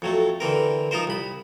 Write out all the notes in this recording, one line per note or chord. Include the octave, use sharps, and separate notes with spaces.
F2 F#3 A3
D3 E3 C4 A#4
F3 D#4 F4 A#4 C5
C2 B5